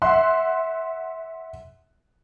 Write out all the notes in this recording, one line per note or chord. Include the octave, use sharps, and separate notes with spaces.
E5 F#5 C6 F#6